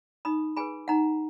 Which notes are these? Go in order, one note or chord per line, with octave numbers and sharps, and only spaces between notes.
D#4 B5 D#6
G#4 B4 G#5 B5
D#4 F#5 A#5